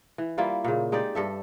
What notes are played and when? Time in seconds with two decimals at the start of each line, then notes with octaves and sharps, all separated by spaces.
0.18 E3
0.38 G3 A#3 E4 F4
0.64 A#2 C#3
0.92 G#3 D#4 G4 D5
1.15 G2 A4 E5